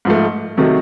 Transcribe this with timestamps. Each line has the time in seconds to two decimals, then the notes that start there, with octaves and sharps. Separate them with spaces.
0.05 G#2 F3 A3
0.57 C3 D#3 F#3 A3